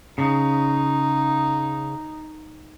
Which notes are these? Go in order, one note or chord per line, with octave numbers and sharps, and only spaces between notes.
C#3 D#4